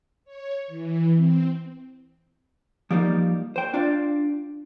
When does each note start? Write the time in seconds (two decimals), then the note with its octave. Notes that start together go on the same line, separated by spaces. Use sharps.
0.25 C#5
0.68 E3
1.16 C4
2.91 F3 G3 A#3 D4 D#4
3.56 C5 G5
3.74 D4 F4 D5 F5